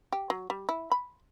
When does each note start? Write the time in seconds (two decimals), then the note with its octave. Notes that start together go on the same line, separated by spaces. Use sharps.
0.12 G4
0.30 F#3
0.50 G3
0.69 E4
0.92 B5